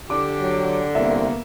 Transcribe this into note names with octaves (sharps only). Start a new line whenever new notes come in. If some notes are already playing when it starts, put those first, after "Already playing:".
D3 G4 D6
F#3
C2 A#3 B3 E5